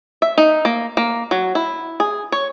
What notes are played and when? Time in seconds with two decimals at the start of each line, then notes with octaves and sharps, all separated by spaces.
0.22 E5
0.38 D#4
0.65 A#3
0.97 A#3
1.31 F#3
1.55 E4
2.00 G#4
2.32 C#5